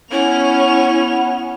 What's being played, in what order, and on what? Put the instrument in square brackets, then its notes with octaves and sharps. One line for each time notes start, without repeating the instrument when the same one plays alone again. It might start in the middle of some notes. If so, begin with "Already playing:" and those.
[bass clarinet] B3 [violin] C#4 F7 [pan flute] E4